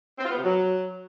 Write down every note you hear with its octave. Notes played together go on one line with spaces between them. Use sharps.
C4
F4
B3
C3
F#3